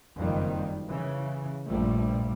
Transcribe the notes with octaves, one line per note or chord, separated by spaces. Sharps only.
F#1 F2 D#3 G3
C#3 E3
A#1 G2 A#2 F3 G3 A3